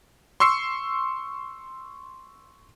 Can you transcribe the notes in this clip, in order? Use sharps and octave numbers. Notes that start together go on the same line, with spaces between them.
C6 C#6 E6 C7 C#7